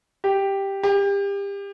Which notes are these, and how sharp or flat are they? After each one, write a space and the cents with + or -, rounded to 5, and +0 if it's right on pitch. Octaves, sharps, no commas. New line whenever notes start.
G4 +0
G4 +30